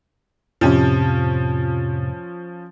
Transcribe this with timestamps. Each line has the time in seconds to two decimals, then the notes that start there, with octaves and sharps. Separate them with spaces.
0.61 F2 A2 C3 F3 C#4